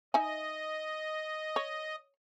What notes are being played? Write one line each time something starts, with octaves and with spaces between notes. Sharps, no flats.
D#4 D#5 E5 G#5
C#5